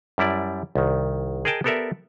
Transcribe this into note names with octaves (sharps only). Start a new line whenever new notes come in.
F#2 G3 E4 D5
C2 D#3
G#4 A#4 D#5 G5 A5
B3 G4 A4 A#4 D5 E5